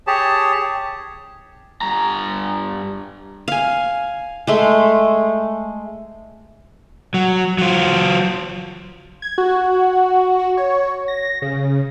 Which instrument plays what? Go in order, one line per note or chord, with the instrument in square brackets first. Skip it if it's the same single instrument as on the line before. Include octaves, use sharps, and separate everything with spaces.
[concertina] G4 G#4 C#5 A5
[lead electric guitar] G2 A#5
[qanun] F5 G#5
G#3 A3 C6
[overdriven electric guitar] F#3
F#3 F4
[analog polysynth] G#6
F#4
F#4
C#5
A#6
C#3